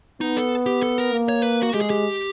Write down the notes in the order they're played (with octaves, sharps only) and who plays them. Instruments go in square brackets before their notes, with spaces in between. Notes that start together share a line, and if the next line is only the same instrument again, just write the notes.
[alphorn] B3 [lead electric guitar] D#4
[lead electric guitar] A4
G4
A4
A#4
[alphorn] A#3
[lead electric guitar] C#5
B4
F#4
[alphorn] G#3 [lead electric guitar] G4
[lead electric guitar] G#4
G4